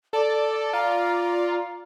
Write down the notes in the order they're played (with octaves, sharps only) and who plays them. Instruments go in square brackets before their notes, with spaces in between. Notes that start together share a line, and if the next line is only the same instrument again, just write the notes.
[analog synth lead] A4 [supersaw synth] D5 [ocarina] A5
[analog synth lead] F4 [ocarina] A#5